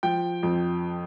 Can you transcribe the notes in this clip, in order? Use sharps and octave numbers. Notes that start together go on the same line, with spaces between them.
F3 G5
F2